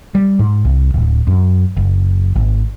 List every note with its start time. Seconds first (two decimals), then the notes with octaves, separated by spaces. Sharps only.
0.15 G3
0.39 G#2
0.65 C2
0.94 D1
1.27 F#2
1.77 F#1
2.36 G#1